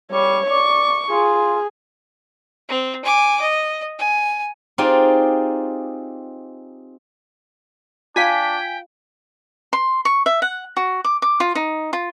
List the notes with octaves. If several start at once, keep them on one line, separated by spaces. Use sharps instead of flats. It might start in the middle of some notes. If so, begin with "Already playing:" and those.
G3 C#5 C#6
D5 C#6
F4 G#4
C4
G#5 D6
D#5
G#5
C4 D#4 F4 G4 G#4 D5
D4 F4 F5 G5 G#5 B6
C6
C#6
E5
F#5
F#4
D6
D6
F4
D#4
F4